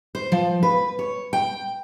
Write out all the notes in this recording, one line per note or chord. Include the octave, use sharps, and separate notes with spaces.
C5
F3
B4
C#5
G5